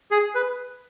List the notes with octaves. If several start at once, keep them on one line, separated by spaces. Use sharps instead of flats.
G#4
B4